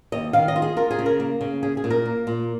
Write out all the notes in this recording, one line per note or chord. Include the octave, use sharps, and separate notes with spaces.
D#2 D#5
D#3 F5
D#5
F4
G#4
F4 A#4
G#4
C#3
A#4
A#3
C#3
C#4 G#4
G#4
A#2
A#4
A#3
A#2